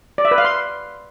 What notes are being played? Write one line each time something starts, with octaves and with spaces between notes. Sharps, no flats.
D5
E5
B4
F5
C6